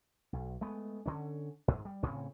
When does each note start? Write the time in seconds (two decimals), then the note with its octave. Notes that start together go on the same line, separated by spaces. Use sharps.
0.33 B1
0.61 G#3 A3 B3
1.06 D3 C#4
1.68 G#2
1.85 G3
2.03 A2 C#3 C4 C#4